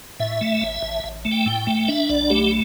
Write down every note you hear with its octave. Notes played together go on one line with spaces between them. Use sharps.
A2 E5
A3
A1
A1
A1
A3
G5
A2
A3
D4 E5
B1 D5
A3 G4